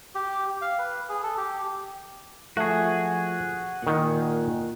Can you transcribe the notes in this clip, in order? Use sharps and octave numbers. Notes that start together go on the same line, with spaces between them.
G4
F5
B4
G#4
A4
G4
F3 A3 F#4 G#4
A#2 D#3 F#5